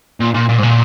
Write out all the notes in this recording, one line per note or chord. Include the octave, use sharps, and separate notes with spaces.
A#2
A#2
A#2
G#2
A#2